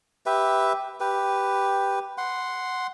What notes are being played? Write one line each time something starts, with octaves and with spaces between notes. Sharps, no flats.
G4 B4 E5
G4 B4
F#5 C6